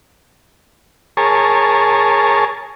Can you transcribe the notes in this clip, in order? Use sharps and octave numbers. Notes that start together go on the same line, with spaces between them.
G#4 A#4 C#5 A5